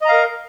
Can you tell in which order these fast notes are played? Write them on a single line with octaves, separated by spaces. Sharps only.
D#5 A#5 F5 A#4